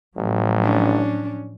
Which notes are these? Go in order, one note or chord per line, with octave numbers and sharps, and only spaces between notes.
A1 A2 F3 F#3
C#4 D4